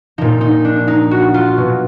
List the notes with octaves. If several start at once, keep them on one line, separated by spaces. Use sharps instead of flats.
A#2 F3 D#4
D#4
D4
D#4
F#4
F4
B2 F#3